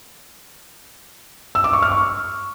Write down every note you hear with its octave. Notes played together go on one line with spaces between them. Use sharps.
E6
D6
C#6
F6
C#6